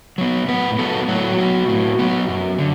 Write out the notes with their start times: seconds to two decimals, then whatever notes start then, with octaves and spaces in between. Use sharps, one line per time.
0.18 F#3 B3
0.48 A2 B3 B4
0.79 F#3 A3 B3 A4
1.08 A2 F#3 F#4
1.38 F#3 B3
1.68 A2
1.99 F#3 B3
2.29 F#2
2.59 D3